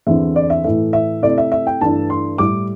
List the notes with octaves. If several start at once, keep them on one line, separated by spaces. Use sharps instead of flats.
E2 D3 C4 E4 E5
D5
E5
A2 E3 A3 E5
E5
C3 A3 E4 D5
E5
E5
G5
G2 E3 A3 D4 A5
C6
A2 G3 E4 D6